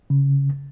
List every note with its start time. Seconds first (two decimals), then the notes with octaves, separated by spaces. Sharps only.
0.10 C#3